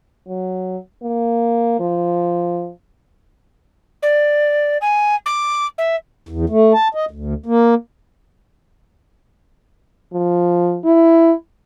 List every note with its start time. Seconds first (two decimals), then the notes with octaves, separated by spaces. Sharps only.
0.28 F#3
1.02 A#3
1.80 F3
4.02 D5
4.81 G#5
5.26 D6
5.78 E5
6.29 E2
6.50 A3
6.73 A5
6.95 D#5
7.11 D2
7.46 A#3
10.13 F3
10.85 E4